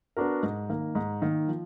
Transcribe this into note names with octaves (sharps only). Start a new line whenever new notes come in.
B3 D4 F#4 A#4
G#2
D#3 A#3
G#2
D#3 A#3
F3